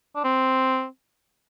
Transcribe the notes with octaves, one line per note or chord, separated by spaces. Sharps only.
D4
C4